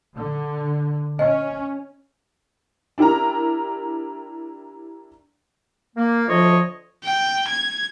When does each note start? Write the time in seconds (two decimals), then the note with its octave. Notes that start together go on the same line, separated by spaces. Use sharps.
0.15 D3
1.19 C#4 D#5
2.98 D4 E4 G4 A#4 A#5
5.96 A#3
6.28 D2 F3 F4 C#5 D#5
7.04 G5
7.48 G#6